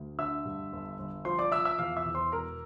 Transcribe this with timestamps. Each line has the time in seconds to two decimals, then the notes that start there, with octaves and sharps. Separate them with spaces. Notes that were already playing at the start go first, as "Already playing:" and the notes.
Already playing: D2
0.19 D3 E5 E6
0.45 G2
0.73 G1
0.99 G1
1.25 F3 C5 C6
1.38 D5 D6
1.52 F3 E5 E6
1.65 E5 E6
1.79 E2 F5 F6
1.96 E5 E6
2.06 E2
2.14 C5 C6
2.32 E1 A#4 A#5